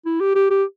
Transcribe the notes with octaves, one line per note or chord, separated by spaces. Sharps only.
E4
G4
G4
G4